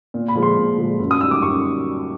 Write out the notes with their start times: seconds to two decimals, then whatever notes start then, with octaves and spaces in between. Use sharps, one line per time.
0.14 A#2
0.28 B5
0.35 F3 G#3
0.43 C6
0.57 A#2
0.78 F3 G#3
0.99 F#2
1.11 D#6
1.21 D#3 G3 E6
1.31 D6
1.42 F#2 C#6